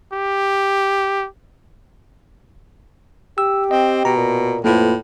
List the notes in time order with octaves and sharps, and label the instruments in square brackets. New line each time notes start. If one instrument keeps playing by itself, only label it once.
[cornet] G4
[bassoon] G4 [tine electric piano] E6
[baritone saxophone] C4 [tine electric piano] D#5
[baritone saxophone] B2 [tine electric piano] A#5
[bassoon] A#2
[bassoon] F2 [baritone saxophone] A2 [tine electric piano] A#3 F4 B4